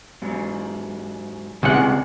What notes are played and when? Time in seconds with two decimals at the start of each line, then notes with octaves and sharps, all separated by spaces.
0.22 G#2 F#3
1.63 C#2 G#2 C3 G#3 F#5